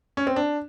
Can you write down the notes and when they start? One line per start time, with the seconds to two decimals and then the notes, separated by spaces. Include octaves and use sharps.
0.17 C#4
0.27 C4
0.36 D4